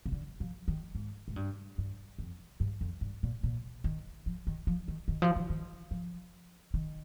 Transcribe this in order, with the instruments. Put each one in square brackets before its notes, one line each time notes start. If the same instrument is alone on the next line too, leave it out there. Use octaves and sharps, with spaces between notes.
[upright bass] C3
D3
F3
D#3
G#2
G#2
G2
G2
F2
G2
F2
G2
A#2
A#2
D#3
F3
D#3
F3
D#3
D#3
F3
D#3
D#3
F3
D#3